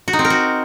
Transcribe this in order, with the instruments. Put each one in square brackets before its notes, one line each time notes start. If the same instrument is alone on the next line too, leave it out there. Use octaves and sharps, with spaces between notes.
[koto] F#4
D#4
C4
A#4
F#4